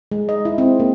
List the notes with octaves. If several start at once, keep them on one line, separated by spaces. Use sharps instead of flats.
G#3
D#5
E4
C4
A#3